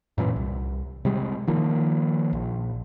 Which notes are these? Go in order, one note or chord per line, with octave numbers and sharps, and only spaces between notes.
F#2 A#2 D#3 E3
C2
C3 G3 G#3
D#3 F3 A#3
A#1